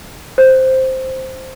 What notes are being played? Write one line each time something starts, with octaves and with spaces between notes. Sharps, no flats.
C5